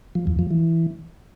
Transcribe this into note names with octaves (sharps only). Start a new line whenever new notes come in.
F3
E2
F3
E3